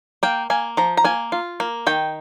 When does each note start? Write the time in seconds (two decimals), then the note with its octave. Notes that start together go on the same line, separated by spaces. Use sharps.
0.23 A#3 G5
0.50 A#3 G#5
0.77 F3 A#5
0.97 A#5
1.04 A#3 G#5
1.32 F4
1.60 A#3
1.87 D#3 G5